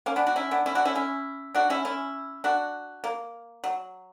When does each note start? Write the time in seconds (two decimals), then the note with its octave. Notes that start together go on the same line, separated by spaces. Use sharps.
0.06 A#3 C#4
0.16 B3 D4
0.26 D4 F#4
0.36 C#4 E4
0.51 B3 D4
0.66 C#4 E4
0.75 D4 F#4
0.85 C#4 E4
0.95 C#4 E4
1.55 D4 F#4
1.70 C#4 E4
1.85 C#4 E4
2.44 D4 F#4
3.04 A#3
3.64 F#3